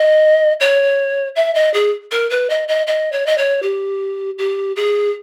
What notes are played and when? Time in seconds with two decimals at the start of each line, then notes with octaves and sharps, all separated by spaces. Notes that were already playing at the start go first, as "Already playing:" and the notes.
Already playing: D#5
0.60 C#5
1.36 E5
1.54 D#5
1.73 G#4
2.11 A#4
2.30 B4
2.49 D#5
2.68 D#5
2.87 D#5
3.12 C#5
3.26 D#5
3.37 C#5
3.62 G4
4.38 G4
4.76 G#4